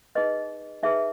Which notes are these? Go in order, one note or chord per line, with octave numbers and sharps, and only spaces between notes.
D#4 G#4 B4 D#5
D#4 G#4 B4 E5